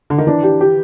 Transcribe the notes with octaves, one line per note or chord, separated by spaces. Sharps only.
D3
D#3
E3 D4
G4
G4